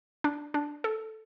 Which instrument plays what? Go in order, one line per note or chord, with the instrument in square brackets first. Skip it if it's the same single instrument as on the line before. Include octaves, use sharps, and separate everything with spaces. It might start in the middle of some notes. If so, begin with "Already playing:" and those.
[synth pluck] D4
D4
A4